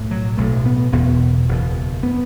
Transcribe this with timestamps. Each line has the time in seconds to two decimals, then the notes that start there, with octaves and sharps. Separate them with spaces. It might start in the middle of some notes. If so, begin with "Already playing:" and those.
Already playing: B1 A2
0.11 F#3
0.37 B1 A2 A3
0.66 B3
0.92 F#1 E2 B2 B3
1.49 F#1 E2 B2
2.03 B3